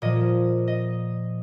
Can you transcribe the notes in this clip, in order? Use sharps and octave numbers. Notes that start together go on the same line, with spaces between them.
A#2 F3 D#5
D#5